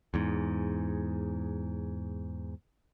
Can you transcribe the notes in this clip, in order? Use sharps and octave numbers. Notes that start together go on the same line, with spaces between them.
E2 G#2